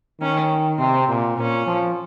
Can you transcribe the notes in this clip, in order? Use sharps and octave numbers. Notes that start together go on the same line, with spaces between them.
D#3 C#4
C3 C4
A#2
A#2 C#4
F3